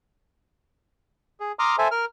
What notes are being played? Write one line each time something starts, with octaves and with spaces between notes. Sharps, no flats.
G#4
A#5 C6 D6 D#6 F6
A4 C5 E5 G#5
A#4 F6